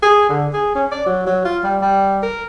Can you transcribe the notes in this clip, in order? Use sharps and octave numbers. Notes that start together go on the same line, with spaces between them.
G#4
D3
G#4
C#4
D5
F#3
F#3
F4
G3
G3
A#4